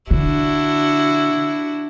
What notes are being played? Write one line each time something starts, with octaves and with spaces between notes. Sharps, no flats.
D3 D4 E4 F#4